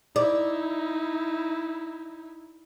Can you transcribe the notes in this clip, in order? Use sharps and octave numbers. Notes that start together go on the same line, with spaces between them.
D#4 E4 D5